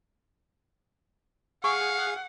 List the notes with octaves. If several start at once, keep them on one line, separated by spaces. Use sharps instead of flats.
G#4 F5 F#5 G#5 C#6